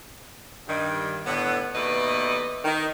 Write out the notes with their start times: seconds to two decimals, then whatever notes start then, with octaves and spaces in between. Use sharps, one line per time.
0.68 G2 D#3 G3
1.26 A2 D3 B3
1.74 D#2 B2 A3 B4 D5 D#5
2.65 D#3